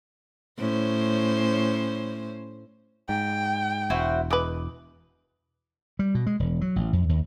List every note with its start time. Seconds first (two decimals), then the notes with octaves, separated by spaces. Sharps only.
0.58 A2 C#4 C5
3.09 G#2 G5
3.90 E1 E4 F#4 C5
4.31 G#3 B4 D6
5.99 G3
6.15 B2
6.27 G#3
6.40 E1
6.61 F#3
6.76 A1
6.93 F2
7.09 D#2